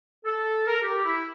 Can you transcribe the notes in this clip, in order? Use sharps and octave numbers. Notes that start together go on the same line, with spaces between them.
A4
A#4
G4
E4